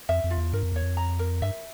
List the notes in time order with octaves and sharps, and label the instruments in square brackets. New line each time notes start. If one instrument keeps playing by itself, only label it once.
[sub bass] F2 [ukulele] E5
[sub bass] F2
[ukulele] F4
[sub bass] E2
[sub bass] G2 [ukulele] A#4
[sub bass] F2
[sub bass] E2 [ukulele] C#5
[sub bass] F2
[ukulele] A#5
A#4
[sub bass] G2 [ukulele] E5